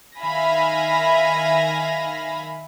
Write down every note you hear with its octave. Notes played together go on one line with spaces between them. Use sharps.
D#3 E5 F5 G#5 B5 A#6